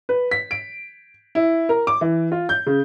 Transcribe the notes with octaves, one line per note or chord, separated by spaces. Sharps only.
B4
B6
D7
E4
A#4
D6
E3
F4
G6
C#3